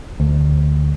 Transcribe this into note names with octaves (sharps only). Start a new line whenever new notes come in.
D2